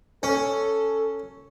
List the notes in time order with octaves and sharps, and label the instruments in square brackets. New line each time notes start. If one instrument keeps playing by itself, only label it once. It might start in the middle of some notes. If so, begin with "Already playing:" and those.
[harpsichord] C#4 [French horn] A4